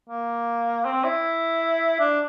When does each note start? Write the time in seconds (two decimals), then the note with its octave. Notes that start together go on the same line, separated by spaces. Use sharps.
0.09 A#3
0.85 C4
1.04 E4
2.00 D4